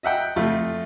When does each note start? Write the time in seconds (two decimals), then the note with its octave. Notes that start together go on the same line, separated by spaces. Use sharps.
0.03 D#5 E5 F#5 G5
0.36 F2 A3 F4